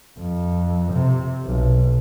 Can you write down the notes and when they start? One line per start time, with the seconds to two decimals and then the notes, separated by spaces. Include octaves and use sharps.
0.19 F2
0.93 C3
1.44 B1